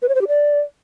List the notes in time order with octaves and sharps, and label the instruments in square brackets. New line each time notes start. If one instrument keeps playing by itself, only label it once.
[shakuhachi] B4
C#5
C5
G4
D5